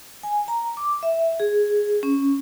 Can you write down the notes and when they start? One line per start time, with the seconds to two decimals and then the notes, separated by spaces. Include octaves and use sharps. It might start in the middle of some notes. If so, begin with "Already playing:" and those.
0.23 G#5
0.48 A#5
0.77 D6
1.03 E5
1.40 G#4
2.03 C#4